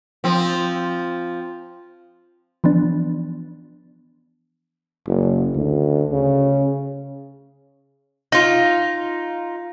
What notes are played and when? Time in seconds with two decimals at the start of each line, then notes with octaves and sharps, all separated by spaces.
0.24 F3 C4
2.64 E3 F3 B3 D4
5.08 F#1
5.56 D2
6.12 C#3
8.32 D#4 F4